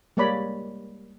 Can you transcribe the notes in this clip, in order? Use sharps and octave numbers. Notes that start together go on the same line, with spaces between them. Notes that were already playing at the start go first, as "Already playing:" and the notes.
G3 G#3 A#3 C#5 D5 B5